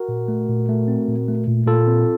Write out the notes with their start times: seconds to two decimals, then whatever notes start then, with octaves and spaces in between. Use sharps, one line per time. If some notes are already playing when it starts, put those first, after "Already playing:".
Already playing: F#4 A#4
0.08 A#2
0.28 A3
0.49 A#2
0.69 A3
0.88 C4
1.08 A#2
1.28 A3
1.47 A#2
1.66 A#2 F4 A4
1.87 C4